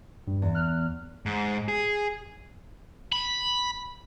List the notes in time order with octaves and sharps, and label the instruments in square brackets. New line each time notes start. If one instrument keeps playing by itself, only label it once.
[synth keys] G2
[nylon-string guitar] E2
[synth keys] F6 F#6
[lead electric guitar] G#2
G#4
[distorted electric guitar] B5